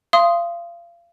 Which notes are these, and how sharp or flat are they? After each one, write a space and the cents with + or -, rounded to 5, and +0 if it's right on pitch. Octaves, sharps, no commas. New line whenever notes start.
F5 -30 C6 +0 D#6 +0